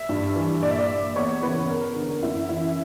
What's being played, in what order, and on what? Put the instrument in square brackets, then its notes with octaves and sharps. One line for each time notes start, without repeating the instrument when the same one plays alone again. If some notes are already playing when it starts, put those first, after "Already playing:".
Already playing: [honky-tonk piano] E5
G2
E3
A#2 D5
E5
D5
E2 C#5
C#3 E3 B4
E2 A#4
D3
F#2 E4
E3 E4